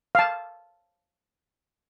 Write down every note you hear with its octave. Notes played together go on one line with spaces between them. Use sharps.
F5 A5